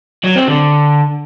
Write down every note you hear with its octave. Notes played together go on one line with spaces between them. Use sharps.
F#3
C4
D3